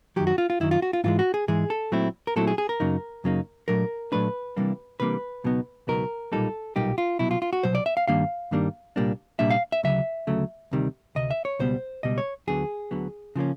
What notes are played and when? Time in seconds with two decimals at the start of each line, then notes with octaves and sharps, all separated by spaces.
0.16 F#2 D#3 F#3 G4
0.27 F#4
0.38 F4
0.50 F4
0.60 F#2 D#3 F#3 E4
0.71 F4
0.82 F#4
0.93 F4
1.04 G#2 E3 G#3 F4
1.19 F#4
1.34 G#4
1.48 G#2 E3 G#3 G#4
1.70 A4
1.92 A#2 F#3 A3 C4 E4
2.27 A#4
2.36 A#2 F#3 A3 C4 E4 A4
2.47 G#4
2.58 G#4
2.69 A#4
2.80 F#2 C#3 F#3 A#3 D#4
3.24 F#2 C#3 F#3 A#3 D#4
3.68 A#2 F#3 A3 D4 A#4
4.12 A#2 F#3 A3 D4 B4
4.57 C3 E3 G3 A#3 D4
5.00 C3 E3 G3 A#3 D4 B4
5.44 C#2 B2 F#3 B3 D#4
5.87 C#2 B2 F#3 B3 D#4 A#4
6.32 B1 A#2 G3 A#3 D#4 A4
6.76 B1 A#2 G3 A#3 D#4 G4
6.98 F4
7.19 C2 B2 F#3 E4
7.31 F4
7.42 F4
7.53 F#4
7.63 C2 B2 F#3 C5
7.75 D5
7.86 E5
7.97 F5
8.08 G2 D#3 G3 A#3 D4 F5
8.51 G2 D#3 G3 A#3 D4
8.96 C2 A#2 G3 A#3 D4
9.39 C2 A#2 G3 A#3 D4 E5
9.51 F5
9.72 E5
9.83 D2 C#3 F#3 E5
10.27 D2 C#3 F#3 A3
10.71 D2 C3 D#3 G3
11.15 D2 C3 D#5
11.31 E5
11.45 C#5
11.59 C#2 B2 G3 B3 C5
12.03 C#2 B2 G3 B3 D#5
12.18 C#5
12.47 D2 D3 F#3 B3 G#4
12.91 D2 D3 F#3 B3
13.36 C#3 F3 A#3 C#4